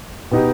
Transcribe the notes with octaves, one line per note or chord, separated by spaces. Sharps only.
B2 B3 D#4 G4